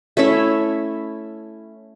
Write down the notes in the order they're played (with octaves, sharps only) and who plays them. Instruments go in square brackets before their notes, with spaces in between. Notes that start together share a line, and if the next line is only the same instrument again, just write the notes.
[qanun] A3 C#4 E4 E5